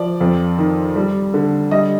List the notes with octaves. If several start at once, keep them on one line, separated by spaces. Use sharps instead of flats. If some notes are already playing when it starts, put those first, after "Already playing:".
Already playing: F3 D5
F2
D#3
G3
D3
G3 D#5